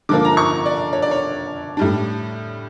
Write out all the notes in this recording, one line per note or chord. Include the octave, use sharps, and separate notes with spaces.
D3 F3 A#3 D6
A#5
C#6
D5
C#5
D5
C#5
A2 G3 D4